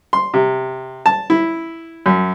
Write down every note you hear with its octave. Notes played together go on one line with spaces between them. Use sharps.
C6
C3
A5
E4
F#2